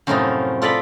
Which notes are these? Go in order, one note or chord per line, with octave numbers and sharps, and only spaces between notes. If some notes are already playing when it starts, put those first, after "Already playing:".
F#2 A2 C3 F3 D#4 D#5
F4 A4 D5 D#5 F5 B5